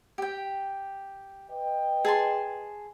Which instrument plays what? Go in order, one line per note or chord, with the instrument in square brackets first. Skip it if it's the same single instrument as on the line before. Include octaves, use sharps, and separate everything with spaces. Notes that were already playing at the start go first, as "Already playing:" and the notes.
[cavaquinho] G4 G5
[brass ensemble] B4 D#5 G5
[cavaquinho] G#4 A5 C6